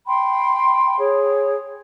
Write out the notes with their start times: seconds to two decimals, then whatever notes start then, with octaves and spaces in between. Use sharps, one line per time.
0.06 G5 B5 C6
0.99 G#4 C#5